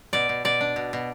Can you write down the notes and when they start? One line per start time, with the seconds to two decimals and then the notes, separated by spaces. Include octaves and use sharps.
0.13 B2 D5
0.29 B2
0.45 B2 D5
0.61 D4
0.76 B2
0.93 B2